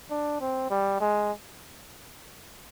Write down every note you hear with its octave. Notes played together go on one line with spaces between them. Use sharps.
D4
C4
G3
G#3